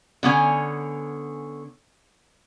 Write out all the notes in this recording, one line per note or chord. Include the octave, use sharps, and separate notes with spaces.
D3 B3 C#4 G#5